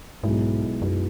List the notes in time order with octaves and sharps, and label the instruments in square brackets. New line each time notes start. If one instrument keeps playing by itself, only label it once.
[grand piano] B1 B2 G#3 E4 [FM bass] G#2
[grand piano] B1 B2 G#3 E4 [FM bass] F#2